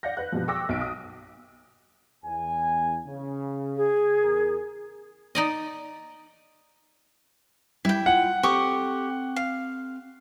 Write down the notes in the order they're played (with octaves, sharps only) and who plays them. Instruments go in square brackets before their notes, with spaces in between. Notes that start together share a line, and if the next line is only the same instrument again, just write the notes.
[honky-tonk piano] D5 F5 F#5 G6 A#6
B4 F#6
G2 B2 F3
G5 C#6 D6 E6 F#6 A#6
B1 D7
D#6
[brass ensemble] E2 G#5
C#3
[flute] G#4
[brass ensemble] E2 A#4
[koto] D#4 D5 D#5
[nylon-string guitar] G3 [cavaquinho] E4 G5
[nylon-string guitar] F4 F5 [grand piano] F#5
[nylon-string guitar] C4 A4 [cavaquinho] G4 C#6 D#6
[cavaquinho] F5